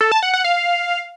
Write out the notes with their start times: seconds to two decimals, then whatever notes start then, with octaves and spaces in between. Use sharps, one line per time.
0.01 A4
0.12 A5
0.23 F#5
0.33 F#5
0.44 F5